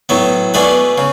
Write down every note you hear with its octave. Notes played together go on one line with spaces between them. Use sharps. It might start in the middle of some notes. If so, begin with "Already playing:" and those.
A2 F#3 B3
B2 A3 D4 G#4 B4
C#3